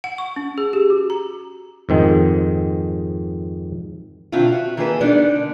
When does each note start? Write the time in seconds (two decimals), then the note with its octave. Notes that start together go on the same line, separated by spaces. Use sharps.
0.04 F#5
0.18 C#6
0.36 C#4
0.58 G#4
0.73 G4
0.90 F#4
1.10 A#5
1.89 F2 G#2 D#3 G#3
4.32 B2 D3 D#3 C4 E4 F4
4.52 F#4
4.77 D#3 E3 A#3 G#4 A4 B4
5.00 G#3 B3 D4 D#4 A#4 D5
5.36 D3